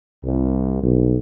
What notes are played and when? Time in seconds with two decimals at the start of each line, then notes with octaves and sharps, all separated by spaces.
0.24 C2
0.83 B1